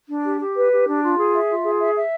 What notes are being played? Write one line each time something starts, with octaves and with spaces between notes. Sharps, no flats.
D4
G4
G4
B4
G4
D4
F4
G#4
E5
F4
G#4
E5
E5